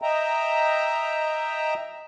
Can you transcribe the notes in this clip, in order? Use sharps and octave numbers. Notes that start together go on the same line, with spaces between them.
D#5 E5 G5 A#5